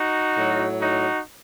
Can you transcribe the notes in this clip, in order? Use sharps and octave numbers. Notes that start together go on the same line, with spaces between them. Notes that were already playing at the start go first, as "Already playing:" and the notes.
Already playing: D#4 F#4
A2 F#3
D#4 F#4